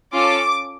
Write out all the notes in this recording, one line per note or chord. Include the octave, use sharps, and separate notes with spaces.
C#4 F4 A4 D6